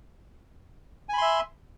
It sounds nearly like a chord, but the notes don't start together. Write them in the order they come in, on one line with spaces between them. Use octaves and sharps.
G#5 B5 C6 E5